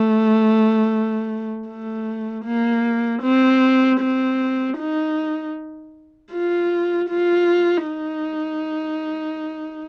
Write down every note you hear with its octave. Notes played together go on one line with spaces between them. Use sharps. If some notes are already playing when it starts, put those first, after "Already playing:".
Already playing: A3
A3
A#3
C4
C4
D#4
F4
F4
D#4